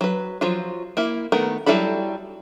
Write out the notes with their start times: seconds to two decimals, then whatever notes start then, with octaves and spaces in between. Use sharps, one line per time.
0.01 F#3 B4
0.41 F3 F#3 F4
0.97 A#3 E4
1.32 D#3 A3 B3 A#4
1.66 F#3 G3 E4 A4 B5